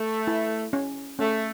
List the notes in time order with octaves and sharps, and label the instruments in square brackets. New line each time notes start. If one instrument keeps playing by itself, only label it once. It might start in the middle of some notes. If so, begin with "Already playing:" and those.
Already playing: [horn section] A3
[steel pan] E4
C#4
[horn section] A3 [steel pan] C#4